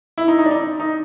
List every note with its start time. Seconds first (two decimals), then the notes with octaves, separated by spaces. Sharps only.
0.18 E4
0.28 D#4
0.39 D#4
0.46 D4
0.51 D#4
0.80 D#4